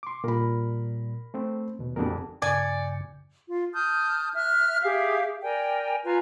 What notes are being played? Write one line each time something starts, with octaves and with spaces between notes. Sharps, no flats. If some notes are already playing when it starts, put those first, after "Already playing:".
C6 D6
A#2 G3 A#4 B5
A3 C4
D#2 B2
F1 F2 D4 F#4 A#4
G2 C#3 D5 G#5
F4
A5 D#6 F6 G6
E5 F6 F#6
G4 G#4 E5 F5
A#4 D5 G5 G#5
F4 B4 G#5 A#5